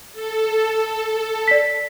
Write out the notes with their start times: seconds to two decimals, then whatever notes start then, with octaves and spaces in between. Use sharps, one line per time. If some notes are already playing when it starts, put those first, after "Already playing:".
0.13 A4
1.48 D5 B6